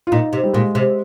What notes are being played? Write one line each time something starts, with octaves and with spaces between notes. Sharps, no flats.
F4
A#2 D#4
C3
G3
A#2 G#3
C3